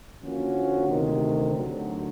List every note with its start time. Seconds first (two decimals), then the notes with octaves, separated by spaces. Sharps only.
0.23 D3 F3 A#3 C#4 F#4
0.88 D2 C3 D#3
1.54 D2 D3 F#3